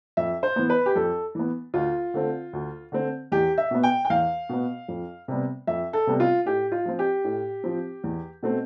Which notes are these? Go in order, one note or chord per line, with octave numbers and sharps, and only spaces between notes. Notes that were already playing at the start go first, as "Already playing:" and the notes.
F2 E5
C5
E3 B3
B4
G4
F2 A4
E3 B3
D2 F4
D3 A3 C4
D2
D3 A3 C4
E2 G4
E5
B2 B3
G5
G5
E2 F5
B2 B3
F2
C3 G3 B3
F2 E5
A4
C3 G3 B3
F4
A2 G4
F4
F3 C4
G4
A2
F3 C4
E2
B2 A3 C4